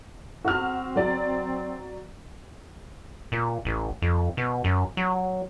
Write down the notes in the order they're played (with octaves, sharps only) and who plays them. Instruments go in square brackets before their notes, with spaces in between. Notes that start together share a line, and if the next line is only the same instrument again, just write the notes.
[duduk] C4 [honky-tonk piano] F#4 F6
[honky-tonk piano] F#3 D5
[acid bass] A#2
A1
F2
B2
F#2
F#3